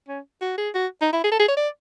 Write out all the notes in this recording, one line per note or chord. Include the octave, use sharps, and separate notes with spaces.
C#4
F#4
G#4
F#4
D#4
E4
G#4
A4
G#4
C#5
D5